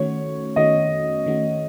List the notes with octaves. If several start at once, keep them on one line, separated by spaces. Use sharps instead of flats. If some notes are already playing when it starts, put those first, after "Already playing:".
Already playing: D#3 A3 C#4 F#4 C#5
D#3 A3 C#4 F#4 D#5
D#3 A3 C#4 F#4